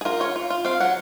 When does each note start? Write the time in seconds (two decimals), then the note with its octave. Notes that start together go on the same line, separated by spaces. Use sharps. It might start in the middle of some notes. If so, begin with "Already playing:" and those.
0.01 G#4
0.05 F4 A#4
0.20 F4 C#5
0.36 F4
0.50 F4
0.65 C4 F5
0.80 F#3 F#5